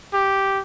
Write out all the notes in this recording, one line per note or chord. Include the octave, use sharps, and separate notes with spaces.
G4